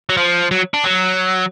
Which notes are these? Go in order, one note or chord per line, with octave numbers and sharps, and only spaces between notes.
F#3
F3
F#3
D4
F#3